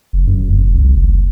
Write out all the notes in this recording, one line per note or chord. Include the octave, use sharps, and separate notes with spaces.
F#1
F#2
F#1
C2
F#1